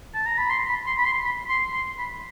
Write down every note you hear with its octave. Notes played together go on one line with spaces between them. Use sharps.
A5
A#5
B5
C6
B5
C6
B5
C6
B5
C6
C6
B5